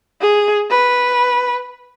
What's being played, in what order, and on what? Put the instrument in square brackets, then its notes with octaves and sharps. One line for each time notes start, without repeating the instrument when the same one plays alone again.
[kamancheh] G#4
B4